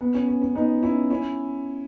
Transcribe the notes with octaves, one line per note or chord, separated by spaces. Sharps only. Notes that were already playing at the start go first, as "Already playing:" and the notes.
B3
C#4
C#4
C#4
B3 D#4
C#4 E4
C#4 E4